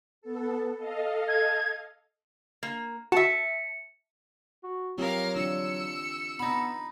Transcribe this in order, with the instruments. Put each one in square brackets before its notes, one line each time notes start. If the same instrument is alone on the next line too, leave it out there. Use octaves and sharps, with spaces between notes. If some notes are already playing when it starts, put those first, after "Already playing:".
[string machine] B3 A4
A4 D#5 F5
[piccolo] G#6
[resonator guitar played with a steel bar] A#3
[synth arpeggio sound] F#4 [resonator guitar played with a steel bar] E5 A5 [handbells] C#7
[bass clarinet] F#4
[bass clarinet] F#3 [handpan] C4 F4 G4 [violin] A#4 F5
[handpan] E3 D4 F4 [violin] E6 C#7
[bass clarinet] B3 [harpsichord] D#4 B5